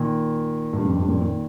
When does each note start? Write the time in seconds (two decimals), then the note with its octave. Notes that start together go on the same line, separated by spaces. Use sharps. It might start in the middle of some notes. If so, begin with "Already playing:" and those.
Already playing: A#2 D#3
0.73 G2
0.85 F2
0.97 G2
1.08 F2 A#2
1.20 A#2 D#3